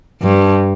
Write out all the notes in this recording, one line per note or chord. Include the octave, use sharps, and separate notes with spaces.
G2